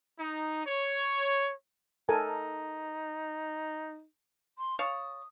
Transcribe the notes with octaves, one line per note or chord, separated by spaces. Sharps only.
D#4
C#5
D#4 A4 A#4 G#5
C6
C#5 F5 A5 D#6